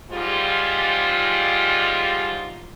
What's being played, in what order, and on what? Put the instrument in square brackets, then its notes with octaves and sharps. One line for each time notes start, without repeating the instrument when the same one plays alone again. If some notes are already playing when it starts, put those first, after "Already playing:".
[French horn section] G#2 G3 F4